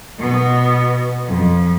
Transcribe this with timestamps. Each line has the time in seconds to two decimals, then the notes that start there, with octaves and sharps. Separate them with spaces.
0.19 B2 B3
1.27 F2